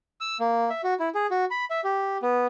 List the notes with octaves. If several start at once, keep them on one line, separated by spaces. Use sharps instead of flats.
E6
A#3
E5
F#4
E4
G#4
F#4
B5
E5
G4
B3